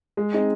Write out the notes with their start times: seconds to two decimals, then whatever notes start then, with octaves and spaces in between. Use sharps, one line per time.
0.17 G#3
0.33 C4 D#4 G#4 D#5